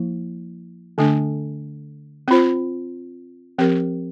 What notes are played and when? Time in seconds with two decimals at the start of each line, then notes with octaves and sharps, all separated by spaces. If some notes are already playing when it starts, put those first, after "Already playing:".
Already playing: F3 A#3 E4
0.98 D3 A3 D4 A4
2.28 C4 F4 C5
3.58 F3 C4 G4 A#4